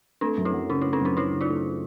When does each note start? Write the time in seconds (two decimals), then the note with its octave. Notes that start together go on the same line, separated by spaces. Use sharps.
0.21 A3 C4 D4
0.37 F#2
0.45 D4 E4
0.54 F#3
0.70 C#3 C#4 D#4
0.81 A3 D4 E4
0.93 C4 D4
1.01 F#2 C#4 D#4
1.17 F#3 D4 E4
1.33 C#3
1.41 D#4 F4
1.48 A3